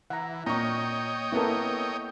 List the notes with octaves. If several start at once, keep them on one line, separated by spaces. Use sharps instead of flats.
E3 F#5 A#5
A#2 C#5 D#5 G5 A#5 C#6
A#3 B3 E4 A4 A#4